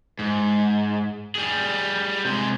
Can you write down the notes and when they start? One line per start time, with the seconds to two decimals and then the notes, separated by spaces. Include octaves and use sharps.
0.19 G#2
1.35 G3 G#4
2.25 C3 G#3